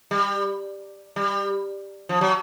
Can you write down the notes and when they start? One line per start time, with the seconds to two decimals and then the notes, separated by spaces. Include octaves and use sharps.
0.11 G3
1.16 G3
2.09 F3
2.21 F#3